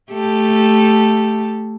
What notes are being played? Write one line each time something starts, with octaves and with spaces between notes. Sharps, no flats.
A3 G4 A4